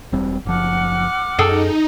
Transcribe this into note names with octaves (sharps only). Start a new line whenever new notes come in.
E1 G3 C4
F#1 F3 F#5 D6 F6
F#2 D#4 G#4 A4 G5